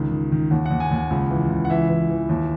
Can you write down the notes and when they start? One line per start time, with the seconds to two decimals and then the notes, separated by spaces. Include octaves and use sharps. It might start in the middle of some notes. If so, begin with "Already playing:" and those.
Already playing: C#2 D#3
0.11 D#3
0.32 D#3
0.51 D#2 F#5
0.66 D#2 F#5
0.80 G#5
0.91 D#2 F#5
1.10 C#2
1.30 E3
1.50 C#2
1.65 F#5
1.70 E3 E5
1.89 E3
2.10 E3
2.29 D#2